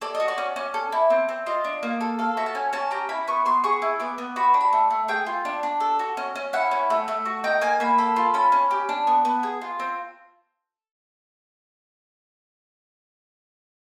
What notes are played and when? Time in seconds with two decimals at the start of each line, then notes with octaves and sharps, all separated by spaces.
0.02 A4 D5
0.15 D#5
0.20 F#4
0.28 D5
0.38 C#4
0.56 C#4
0.74 A4
0.92 E4
1.10 C4
1.29 C4
1.46 F4 D#5
1.65 D4
1.83 A#3
2.01 A4
2.19 A4 F5
2.37 F#4 E5
2.46 A5
2.55 C#4 G#5
2.73 C#4 A5
2.91 G4 A#5
3.09 E4 B5
3.28 B3 C#6
3.45 B3 C6
3.64 G#4 C#6
3.82 E4
4.00 B3 D6
4.18 B3
4.36 F#4 B5
4.54 D4
4.61 B5
4.73 A3
4.90 A3
5.08 G#4 G5
5.27 F4
5.45 D4
5.63 D4
5.80 A4
5.99 F#4
6.17 C#4
6.35 C#4
6.53 E4 F#5
6.71 C#4
6.90 A3
7.08 A3
7.25 F#4
7.44 D#4 G5
7.61 A#3 G#5
7.80 A#3 B5
7.98 A4 B5
8.16 F4
8.34 C#4 B5
8.52 C#4
8.71 G4
8.89 D4
9.07 B3
9.25 B3
9.43 G#4
9.61 F4
9.79 C4